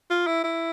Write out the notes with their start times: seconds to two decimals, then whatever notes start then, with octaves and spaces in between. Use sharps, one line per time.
0.10 F4
0.27 E4
0.44 E4